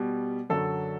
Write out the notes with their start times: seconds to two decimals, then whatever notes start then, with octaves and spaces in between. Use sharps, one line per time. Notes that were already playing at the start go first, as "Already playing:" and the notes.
Already playing: B2 G3
0.50 F#2 D3 F#3 A4